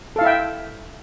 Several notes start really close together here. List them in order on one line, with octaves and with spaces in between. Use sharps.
A4 F5 E4 E5 G5